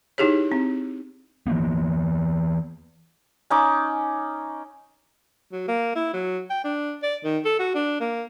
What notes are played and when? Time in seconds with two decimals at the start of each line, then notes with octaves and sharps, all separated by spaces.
0.18 D#4 E4 G4 G#4 C#5
0.52 C4
1.47 E3 F3 A#3 B3
3.50 C#4 D#4 D6
5.52 F#3
5.68 A#3
5.96 E4
6.14 F#3
6.50 G5
6.64 D4
7.03 D5
7.24 D#3
7.45 A4
7.59 F#4
7.75 D4
8.00 A#3